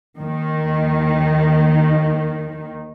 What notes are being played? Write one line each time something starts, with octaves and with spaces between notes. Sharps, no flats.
D#2 D#3